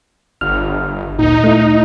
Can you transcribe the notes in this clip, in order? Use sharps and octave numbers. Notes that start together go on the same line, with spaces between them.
G1 F6
D2 A#2 D#4
A3 E4